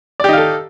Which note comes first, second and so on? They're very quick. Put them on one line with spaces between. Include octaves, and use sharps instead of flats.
D5 G4 D#4 F5 A4